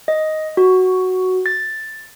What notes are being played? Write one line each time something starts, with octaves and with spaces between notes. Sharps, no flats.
D#5
F#4
A6